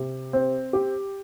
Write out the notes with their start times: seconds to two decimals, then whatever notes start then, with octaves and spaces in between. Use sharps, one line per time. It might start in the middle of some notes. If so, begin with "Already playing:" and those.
Already playing: C3
0.33 C4
0.73 G4